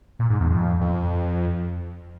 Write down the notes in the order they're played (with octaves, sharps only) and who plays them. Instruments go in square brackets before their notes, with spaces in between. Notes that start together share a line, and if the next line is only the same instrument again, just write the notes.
[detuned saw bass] A#2
G#2
E2
F2
F2